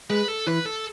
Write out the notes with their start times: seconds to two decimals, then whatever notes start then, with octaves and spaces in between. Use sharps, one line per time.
0.10 G#3 B4
0.28 A4
0.47 E3 B4
0.65 A4